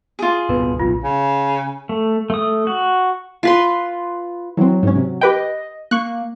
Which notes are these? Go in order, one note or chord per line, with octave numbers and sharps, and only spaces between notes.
F4 G#4
D1 B2 B3 B4
A#1 B2 F4
C#3
A3
A3 D#6
F#4
F4 B4 C6
E3 F#3 C4
G#2 C#4
C3
G4 B4 D#5 G5
A#3 C#6 F#6